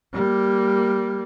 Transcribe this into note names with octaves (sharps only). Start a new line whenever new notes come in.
G3 A#3